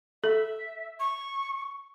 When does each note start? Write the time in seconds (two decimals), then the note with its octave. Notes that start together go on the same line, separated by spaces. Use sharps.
0.24 A4 E5
1.00 C#6